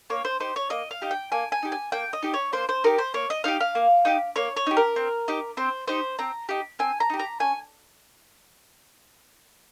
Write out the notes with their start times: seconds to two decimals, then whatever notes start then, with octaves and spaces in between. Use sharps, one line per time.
0.10 A#3 C#5
0.25 C5
0.40 D#4 G4 C5
0.56 C#5
0.70 A#3 D#5
0.91 F5
1.02 D#4 G4
1.11 G5
1.32 A#3 G#5
1.52 G#5
1.63 D#4 G4
1.72 G#5
1.92 A#3 G5
2.13 D#5
2.23 D#4 G4
2.34 C#5
2.53 A#3 C5
2.69 C5
2.84 D#4 G4 A#4
2.98 C5
3.14 A#3 C#5
3.30 D#5
3.44 D#4 G4 F5
3.60 F5
3.75 A#3
4.05 D#4 G4
4.36 A#3 C#5
4.56 C#5
4.66 D#4 G4
4.77 A#4
4.96 C4
5.28 D#4 G4
5.57 C4 C5
5.88 D#4 G4 C5
6.19 C4 A#5
6.49 D#4 G4
6.79 C4 G#5
7.00 A#5
7.10 D#4 G4
7.19 A#5
7.40 C#4 G#5